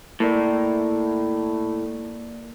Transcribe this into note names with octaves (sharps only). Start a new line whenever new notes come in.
A2 A#3 A#4 D5